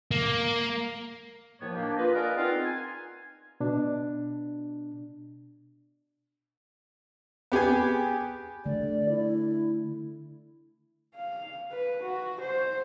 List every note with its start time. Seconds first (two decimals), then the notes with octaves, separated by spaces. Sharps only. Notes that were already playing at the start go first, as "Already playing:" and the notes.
0.11 A#3
1.60 D#2 A2 F3 A#3 B3 C#5
1.74 A#3 D4 G4
1.97 F4 B4 D#5
2.13 G#4 A#4 D5 D#5 F#5
2.36 B3 C4 D#4 F4
2.65 G#5
3.60 B2 D4
7.52 B3 G4 G#4 G#5
8.66 D3 A3 D5
9.09 E4
11.16 F5
11.72 B4
12.03 F#4
12.41 C5